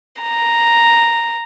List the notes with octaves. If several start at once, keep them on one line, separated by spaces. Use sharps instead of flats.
A#5